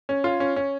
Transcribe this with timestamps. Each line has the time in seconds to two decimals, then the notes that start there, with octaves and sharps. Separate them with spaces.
0.09 C#4
0.24 F4
0.40 C#4
0.56 C#4